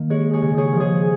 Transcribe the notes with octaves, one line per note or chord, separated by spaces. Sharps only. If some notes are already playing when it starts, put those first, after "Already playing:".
Already playing: D#3 A#3
G#3 G#4 C#5
G#4 C#5
C#3
G#4 C#5
F3
G#4 C#5